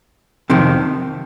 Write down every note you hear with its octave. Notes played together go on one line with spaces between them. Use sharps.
F2 C3 D#3